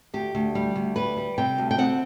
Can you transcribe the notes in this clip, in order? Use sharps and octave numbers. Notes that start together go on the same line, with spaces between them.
D2 G4
D2
G3
D2
G3 B4
G3
C3 G5
D2
G5
C4 F#5